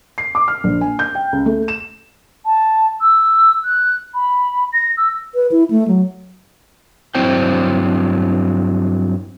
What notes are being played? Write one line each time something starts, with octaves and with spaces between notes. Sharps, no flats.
C7
D6
F6
A#1
G#5
G6
G5
C#2
A3
E7
A5
E6
F#6
B5
A#6
E6
B4
E4
A3
F#3
G2 F#3 C4 E4 C5 G5